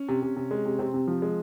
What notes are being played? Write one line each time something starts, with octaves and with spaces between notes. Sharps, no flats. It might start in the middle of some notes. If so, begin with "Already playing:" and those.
Already playing: C#4
C3
C3
C3
G#3
C3
C3 C4
C3
F3
G#3